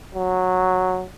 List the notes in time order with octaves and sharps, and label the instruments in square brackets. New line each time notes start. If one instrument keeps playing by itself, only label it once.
[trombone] F#3